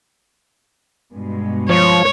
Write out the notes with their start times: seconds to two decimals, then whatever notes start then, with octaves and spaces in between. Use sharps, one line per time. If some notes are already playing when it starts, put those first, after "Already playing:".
1.13 G2 B2 G#3
1.69 F3 C#5